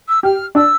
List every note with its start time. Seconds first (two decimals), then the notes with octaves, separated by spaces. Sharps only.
0.08 E6
0.23 G4 F6
0.55 D4 E6